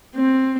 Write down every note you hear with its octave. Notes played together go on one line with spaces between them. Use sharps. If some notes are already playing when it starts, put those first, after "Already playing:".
C4